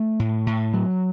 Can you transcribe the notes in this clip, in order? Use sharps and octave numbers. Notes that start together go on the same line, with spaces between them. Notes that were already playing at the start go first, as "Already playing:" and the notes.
Already playing: A3
A2
A2
F#3